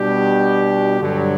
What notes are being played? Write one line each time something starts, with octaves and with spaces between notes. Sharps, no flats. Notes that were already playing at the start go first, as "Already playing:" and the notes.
Already playing: B2 G3 D4 G4
G2 D3 F#3